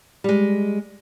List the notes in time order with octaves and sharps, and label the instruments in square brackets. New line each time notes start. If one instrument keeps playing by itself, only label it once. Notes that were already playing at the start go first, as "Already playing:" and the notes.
[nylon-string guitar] G3 G#3